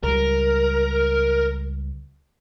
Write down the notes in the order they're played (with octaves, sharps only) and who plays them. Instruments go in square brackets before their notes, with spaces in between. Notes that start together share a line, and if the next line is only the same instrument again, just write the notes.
[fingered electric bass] C#2 G3 [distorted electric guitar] A#4